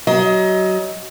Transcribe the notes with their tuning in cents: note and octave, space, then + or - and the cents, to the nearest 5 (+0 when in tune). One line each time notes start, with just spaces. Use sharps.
F#3 +25 D#5 +25